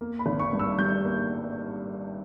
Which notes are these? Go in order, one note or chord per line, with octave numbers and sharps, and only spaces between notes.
A#3
B5
G#1
C#6
G2
E6
G3 G6
A#3